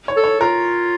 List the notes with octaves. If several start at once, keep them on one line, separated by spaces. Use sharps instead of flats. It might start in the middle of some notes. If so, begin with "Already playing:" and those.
C#5
A4
C#5
F4 A#4